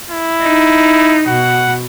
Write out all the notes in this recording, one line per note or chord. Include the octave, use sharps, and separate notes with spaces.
E4
D#4
B2 F#5